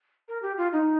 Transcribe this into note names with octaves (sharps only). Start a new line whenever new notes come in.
A#4
G4
F4
D#4